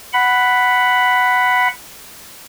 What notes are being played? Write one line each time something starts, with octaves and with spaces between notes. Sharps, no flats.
F#5 B5